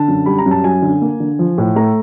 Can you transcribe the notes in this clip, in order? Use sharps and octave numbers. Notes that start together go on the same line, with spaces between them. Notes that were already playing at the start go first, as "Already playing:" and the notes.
Already playing: D3 A5
F#2
G3 B5
A#5
F#2
A5
F#3 G#5
D3
A#3
D3
F3
A2
A3 A#5